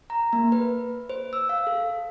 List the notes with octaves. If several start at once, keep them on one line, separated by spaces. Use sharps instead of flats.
A#5
A#3
B4
C5
E6
F5
A4